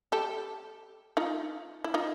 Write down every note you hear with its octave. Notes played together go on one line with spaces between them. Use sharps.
G4 A4
D#4 F4
E4
D#4 F4